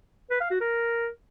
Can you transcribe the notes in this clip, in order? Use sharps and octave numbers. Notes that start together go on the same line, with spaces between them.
B4
F5
F#4
A#4